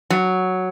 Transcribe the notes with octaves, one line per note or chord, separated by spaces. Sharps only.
F#3